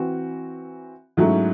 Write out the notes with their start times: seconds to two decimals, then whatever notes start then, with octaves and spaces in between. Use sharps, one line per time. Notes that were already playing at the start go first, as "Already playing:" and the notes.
Already playing: E3 C4 F#4
1.17 G#2 F#3 A3 C#4 E4